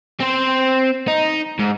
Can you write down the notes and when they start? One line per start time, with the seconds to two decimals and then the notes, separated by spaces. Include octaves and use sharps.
0.21 C4 C5
1.08 D#4
1.59 G#2